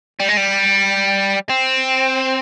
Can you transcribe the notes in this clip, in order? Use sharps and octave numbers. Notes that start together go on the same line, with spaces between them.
G3
G#3
G3
C4